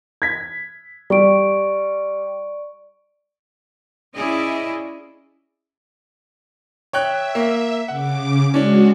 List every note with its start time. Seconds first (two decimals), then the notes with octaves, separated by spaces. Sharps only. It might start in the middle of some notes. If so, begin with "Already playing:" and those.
0.22 G#6 B6
1.10 G3 D5 C#6 D7
4.15 C#4 E4 G#4 D5 D#5
6.93 C#5 E5 G5 F#6
7.35 A#3
7.88 C#3 F#5 D6
8.54 G#3 C#4 D4 F#4